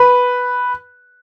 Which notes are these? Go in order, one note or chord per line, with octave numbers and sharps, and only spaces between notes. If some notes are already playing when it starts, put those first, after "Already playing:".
Already playing: B4